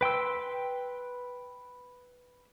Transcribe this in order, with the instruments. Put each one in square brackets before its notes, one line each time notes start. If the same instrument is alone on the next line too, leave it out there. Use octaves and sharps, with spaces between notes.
[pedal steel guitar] B4 G5 C6 E6